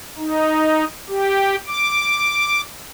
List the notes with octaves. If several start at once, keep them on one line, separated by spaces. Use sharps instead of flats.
D#4
G4
D6